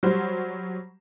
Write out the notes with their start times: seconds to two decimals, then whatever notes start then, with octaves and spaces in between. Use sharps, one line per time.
0.03 F#3 G3 C5